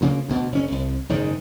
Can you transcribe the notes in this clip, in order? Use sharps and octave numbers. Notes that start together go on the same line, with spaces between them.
D2 C#3 A#3
D2 B2
F#1 C#4
C2
F#1 G#2 D#3